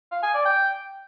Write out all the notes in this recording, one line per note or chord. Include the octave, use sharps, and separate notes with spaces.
F5
G#5
D5
G5